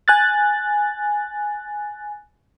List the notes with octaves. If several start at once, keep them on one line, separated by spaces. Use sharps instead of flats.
G#5 F#6 A6